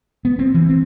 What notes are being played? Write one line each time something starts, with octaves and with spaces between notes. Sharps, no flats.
B3
C4
E3
C4